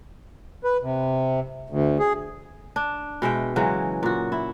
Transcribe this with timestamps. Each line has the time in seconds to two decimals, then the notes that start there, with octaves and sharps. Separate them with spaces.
0.64 B4
0.82 C3
1.70 D2
1.99 G#4
2.76 D4
3.22 B2 G#3 E5 G5
3.56 C#3 E3 F#3 G#3
4.03 A#2 F#4
4.32 E4